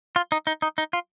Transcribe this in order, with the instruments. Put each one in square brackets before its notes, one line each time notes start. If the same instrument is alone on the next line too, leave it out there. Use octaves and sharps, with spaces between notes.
[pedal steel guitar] F4
D#4
D#4
D#4
D#4
F4